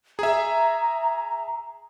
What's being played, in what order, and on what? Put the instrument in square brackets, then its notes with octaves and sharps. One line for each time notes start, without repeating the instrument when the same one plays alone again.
[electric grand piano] G#4 E5 [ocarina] A#5